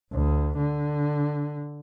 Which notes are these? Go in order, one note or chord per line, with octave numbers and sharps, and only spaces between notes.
D2
D3